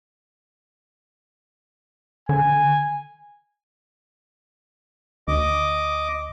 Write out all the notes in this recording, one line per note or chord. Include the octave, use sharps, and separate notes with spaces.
D3 G#5
D2 D#5 D6